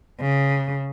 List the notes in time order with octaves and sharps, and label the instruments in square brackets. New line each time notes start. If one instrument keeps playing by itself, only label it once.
[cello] C#3